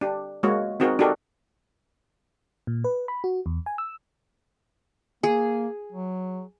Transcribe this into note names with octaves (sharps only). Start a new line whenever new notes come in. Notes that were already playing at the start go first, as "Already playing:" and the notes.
D4 G4
G#3 A#3 F#4 C#5
C4 D#4 F#4 G#4 A#4
D4 D#4 F#4 G4 A4 A#4
A#2
B4
B5
F#4
E2
G#5
E6
A#3 G#4
F#3